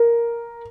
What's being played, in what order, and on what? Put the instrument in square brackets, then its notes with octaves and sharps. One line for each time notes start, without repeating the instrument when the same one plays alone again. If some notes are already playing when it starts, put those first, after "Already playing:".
Already playing: [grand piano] A#4